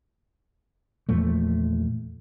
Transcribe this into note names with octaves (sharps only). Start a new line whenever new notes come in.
E2 A#2 F3 A3